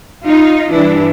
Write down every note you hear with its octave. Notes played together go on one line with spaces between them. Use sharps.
D#4 F4
G2 E3 G3 D4 E4